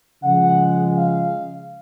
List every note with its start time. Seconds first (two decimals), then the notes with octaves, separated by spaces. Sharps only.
0.23 C#3 F3 G#3 F#5
0.98 F5